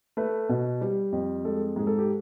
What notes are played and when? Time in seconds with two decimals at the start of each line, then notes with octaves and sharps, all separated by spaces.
0.17 A3 B4
0.49 B2
0.81 G3
1.12 F2
1.45 G#3 A4
1.76 G#2 G#4
1.87 A4
1.98 G4